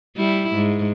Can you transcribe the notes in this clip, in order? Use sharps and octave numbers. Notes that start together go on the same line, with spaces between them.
G3 E4
G#2